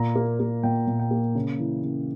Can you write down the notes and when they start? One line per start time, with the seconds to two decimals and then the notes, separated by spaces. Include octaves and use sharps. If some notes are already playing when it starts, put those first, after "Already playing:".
Already playing: A#2 A#5
0.16 A#3
0.40 A#3
0.63 A#2 G5
0.87 A#2
0.99 G5
1.11 A#3
1.35 C#3
1.59 E3
1.83 C#3